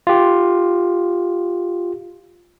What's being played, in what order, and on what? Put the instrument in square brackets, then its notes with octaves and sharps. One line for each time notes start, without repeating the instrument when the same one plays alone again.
[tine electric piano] F4 G4